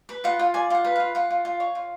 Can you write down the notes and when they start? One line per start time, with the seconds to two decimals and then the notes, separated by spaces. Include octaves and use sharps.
0.09 B4 B5
0.24 F4 F#5
0.39 F4 F#5
0.54 D5 G#5
0.70 F4 F#5
0.85 B4
0.96 F5
1.00 F4
1.15 F4 F#5
1.31 F4
1.45 F4
1.60 C#5
1.75 F4